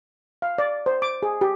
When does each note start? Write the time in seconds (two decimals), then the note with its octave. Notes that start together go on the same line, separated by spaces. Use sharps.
0.42 F5
0.58 D5
0.86 C5
1.02 D6
1.23 G#4
1.41 G4